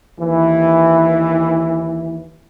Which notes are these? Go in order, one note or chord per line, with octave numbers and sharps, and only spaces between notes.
D#2 E3